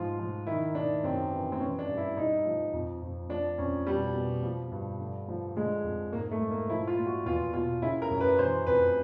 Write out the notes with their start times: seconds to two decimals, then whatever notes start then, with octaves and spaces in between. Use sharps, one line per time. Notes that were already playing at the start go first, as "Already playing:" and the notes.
Already playing: G#2 F3 F4
0.19 F3
0.47 D#3 E4
0.75 D#3 D4
1.03 F#2 C4
1.31 E3
1.52 C4
1.60 E3 C#4
1.79 D4
1.88 G2
1.97 E4
2.17 G2 D#4
2.45 F3
2.73 F2
3.02 F2
3.29 F3 D4
3.58 F2 C#4
3.87 B2 G3
4.15 B2
4.43 F3
4.72 G2
5.00 D3
5.28 F3
5.56 D3 G#3
5.84 F2
6.13 G#2 A#3
6.31 A3
6.41 G#2
6.51 A#3
6.69 F3 E4
6.87 F4
6.97 A#2
7.06 F#4
7.26 E2 F4
7.53 B2 F4
7.82 C#3 E4
8.02 A#4
8.10 F#2
8.21 B4
8.39 E3 C5
8.67 F2 B4